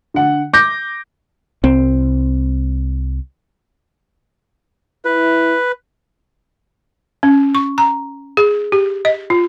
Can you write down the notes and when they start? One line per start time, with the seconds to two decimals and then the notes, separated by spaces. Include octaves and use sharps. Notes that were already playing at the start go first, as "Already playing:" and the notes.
0.14 D3 F#5
0.53 D6 G6 A#6
1.64 C2 C4
5.05 E4 B4
7.23 C#4
7.55 C#6
7.78 A#5
8.37 G#4
8.72 G4
9.05 D#5
9.30 F4